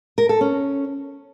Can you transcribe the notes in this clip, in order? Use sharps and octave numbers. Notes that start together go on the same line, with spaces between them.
A#4
A4
C#4